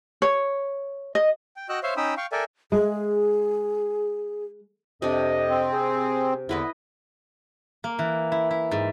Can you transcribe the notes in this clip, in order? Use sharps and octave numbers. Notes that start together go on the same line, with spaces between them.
C#5
D#5
G5
F#4 D#5 G5 E6 F#6
C5 C#5 E5 F5 C6
C#4 D#4 G5 B5 D#6 E6
F5 G5 C#6
A4 A#4 D5 E5 G5 G#5
G#3 G#4
F2 C3 D4 D#5
C4
G#4 C5
E2 D3 E4 B4 D#5
A#3
E3
E4
E4
G#2